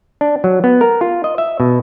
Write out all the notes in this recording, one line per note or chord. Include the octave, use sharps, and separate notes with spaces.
D4
F#3
B3
A#4
F4
D#5
E5
B2